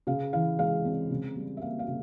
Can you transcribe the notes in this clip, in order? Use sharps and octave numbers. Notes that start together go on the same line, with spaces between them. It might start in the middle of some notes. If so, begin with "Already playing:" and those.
C#3 F5
E3 F5
G#3 F5
C4
C#3
G3
E5
A#3 F5
F5
C#3